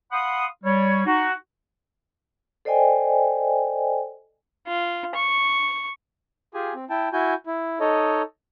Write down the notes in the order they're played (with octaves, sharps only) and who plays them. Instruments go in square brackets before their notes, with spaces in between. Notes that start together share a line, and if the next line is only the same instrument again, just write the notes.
[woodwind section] F5 F#5 B5 C6 D#6
G3 C#5
D#4 F#4
[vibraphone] A4 C5 D5 D#5 G5 G#5
[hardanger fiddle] F4
C#6
[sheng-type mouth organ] F4 G4 G#4 G#5
C4
E4 G5 A5
E4 F#4 G#5 G6
E4
D#4 A4 C#5 D#5